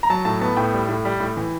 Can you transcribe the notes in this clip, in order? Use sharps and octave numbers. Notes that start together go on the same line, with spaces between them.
A#5
F#3 A5
A2 A5
B3 A5
A2 G5
G3
A2
G3
A2
E3